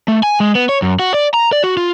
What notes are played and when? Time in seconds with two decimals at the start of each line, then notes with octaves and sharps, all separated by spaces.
0.08 A3
0.23 G#5
0.40 G#3
0.55 B3
0.69 C#5
0.82 F#2
0.99 F#4
1.14 D5
1.34 A#5
1.52 D5
1.64 F#4
1.77 F4